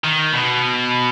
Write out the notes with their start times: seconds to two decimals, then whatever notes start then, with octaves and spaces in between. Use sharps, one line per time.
0.04 D#3
0.33 B2